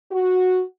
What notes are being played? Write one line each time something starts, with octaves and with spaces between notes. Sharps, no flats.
F#4